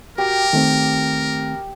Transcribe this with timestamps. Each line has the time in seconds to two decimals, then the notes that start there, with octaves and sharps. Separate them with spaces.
0.18 F#4 G4 A#4
0.53 D#3 A3 C4